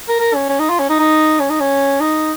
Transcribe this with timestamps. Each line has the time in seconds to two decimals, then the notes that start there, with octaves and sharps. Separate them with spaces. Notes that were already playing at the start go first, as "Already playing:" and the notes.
0.09 A#4
0.20 A#4
0.35 C#4
0.49 C#4
0.59 D#4
0.69 F4
0.79 C#4
0.89 D#4
0.99 D#4
1.40 C#4
1.50 D#4
1.60 C#4
2.01 D#4